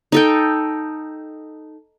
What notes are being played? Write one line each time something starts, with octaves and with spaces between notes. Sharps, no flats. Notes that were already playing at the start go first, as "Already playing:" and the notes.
D#4 A4 G5